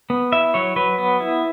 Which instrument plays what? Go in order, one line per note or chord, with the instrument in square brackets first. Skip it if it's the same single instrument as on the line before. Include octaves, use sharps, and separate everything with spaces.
[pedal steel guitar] B3
E4 E5
F#3 C#5
F#3 B4
B3
E4